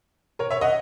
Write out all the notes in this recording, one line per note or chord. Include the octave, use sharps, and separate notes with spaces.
A#4 C#5
C#5 E5
D#5 F#5